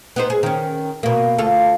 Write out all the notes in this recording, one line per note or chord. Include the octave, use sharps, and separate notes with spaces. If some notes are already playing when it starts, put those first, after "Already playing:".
B3 D#4 C5
G#4
D#3 C#4
B2 A#3
D2 F4 A4